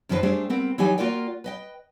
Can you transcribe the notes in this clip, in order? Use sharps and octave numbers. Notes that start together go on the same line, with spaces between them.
F#2 D#3 F3 D#4 B4 C5
G3 A3 D4 G4 G#4 C5
B3 C4 A#4
E3 F#3 D#4 G4 G5 G#5
A#3 F4 F#4 A#4 D5 G5
B4 D#5 G5